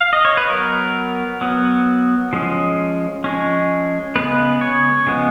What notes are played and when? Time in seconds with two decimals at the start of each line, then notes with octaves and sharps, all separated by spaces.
0.00 F5
0.13 D#5
0.25 C#5
0.37 B4
0.50 F#3 B3 A#4
1.41 F#3 B3
2.33 F3 G#3 C#4
3.24 F3 G#3 C#4
4.16 C#3 F3 G#3 B3 B4
4.61 C#5
5.07 C#3 F3 G#3 B3